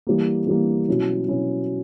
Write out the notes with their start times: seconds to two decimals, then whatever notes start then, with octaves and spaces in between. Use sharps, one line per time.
0.07 E3 G3 A#3
0.47 E3 G3 A#3
0.88 B2 F#3 C#4 E4
1.28 B2 F#3 C#4 E4